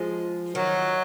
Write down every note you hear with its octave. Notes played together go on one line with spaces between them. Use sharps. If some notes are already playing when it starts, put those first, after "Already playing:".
Already playing: F3 G#3
D#3 F#3